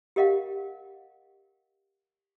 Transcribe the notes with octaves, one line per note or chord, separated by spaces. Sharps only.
G4 A#4 D#5 F5 F#5